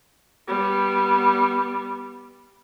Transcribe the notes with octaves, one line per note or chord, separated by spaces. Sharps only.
G3 B3